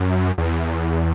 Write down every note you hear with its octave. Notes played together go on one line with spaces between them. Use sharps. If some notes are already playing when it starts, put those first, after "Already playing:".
Already playing: F#2
E2